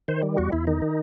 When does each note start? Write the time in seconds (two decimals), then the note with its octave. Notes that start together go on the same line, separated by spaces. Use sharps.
0.08 D#3 C5
0.23 G3
0.37 E2 F#4
0.52 E2 E4
0.67 D#3 D#4
0.82 D#3